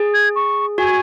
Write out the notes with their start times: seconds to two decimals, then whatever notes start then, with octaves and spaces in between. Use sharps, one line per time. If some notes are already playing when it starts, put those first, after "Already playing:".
Already playing: G#4
0.14 G#6
0.36 C#6
0.78 F#4 G#5